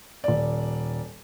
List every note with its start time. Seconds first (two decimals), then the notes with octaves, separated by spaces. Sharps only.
0.24 D#1 D5